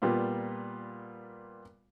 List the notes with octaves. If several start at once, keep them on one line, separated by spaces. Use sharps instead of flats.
A#2 G3 B3 F4